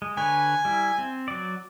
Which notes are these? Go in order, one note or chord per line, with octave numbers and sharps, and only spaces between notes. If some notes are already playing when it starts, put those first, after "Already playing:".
G#3
D3 B4 C#5 G#5
G3 E4
C4
F#3 D5